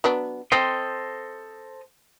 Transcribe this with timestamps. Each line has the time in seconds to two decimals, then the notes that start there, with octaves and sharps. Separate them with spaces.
0.04 F#3 B3 D4
0.52 C4 A4 C5 D#5